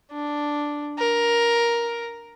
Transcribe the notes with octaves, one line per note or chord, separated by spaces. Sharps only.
D4
A#4